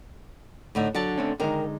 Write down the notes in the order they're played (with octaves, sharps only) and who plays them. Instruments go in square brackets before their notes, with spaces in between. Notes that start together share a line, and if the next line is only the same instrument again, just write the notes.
[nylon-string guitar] A2 D3 D#4
[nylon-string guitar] D3 D4 A5 [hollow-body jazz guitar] F#3
[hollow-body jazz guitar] A3 C4 C#4
[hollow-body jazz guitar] D3 G#3 D#4 [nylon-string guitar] D#3 A#4